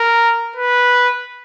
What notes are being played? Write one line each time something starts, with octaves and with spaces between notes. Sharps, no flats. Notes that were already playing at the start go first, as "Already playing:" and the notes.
Already playing: A#4
B4